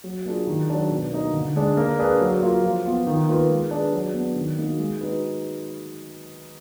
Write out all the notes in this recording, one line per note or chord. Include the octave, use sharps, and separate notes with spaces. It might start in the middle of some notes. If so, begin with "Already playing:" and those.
F#3
A#3 D4 F4 G#4
D#3
F#3 D4
B2
A#3 D#4
D3
G#3 D4
A#3
D4 G#4 B4
F#3
A#3 F4 A#4
F3
B3 F4
D#3
A#3 F4 B4
G#3
D4 G#4 B4
F#3
B3 D4
D#3
A#3 D#4 F#4
G#3
D#4 F#4 B4